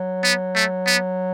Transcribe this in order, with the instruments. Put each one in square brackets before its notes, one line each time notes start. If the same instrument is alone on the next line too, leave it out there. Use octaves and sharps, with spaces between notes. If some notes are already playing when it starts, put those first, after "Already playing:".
Already playing: [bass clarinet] F#3
[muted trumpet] B3
A3
B3